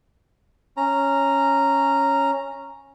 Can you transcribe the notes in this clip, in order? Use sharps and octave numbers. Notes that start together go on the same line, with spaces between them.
C#4 A#5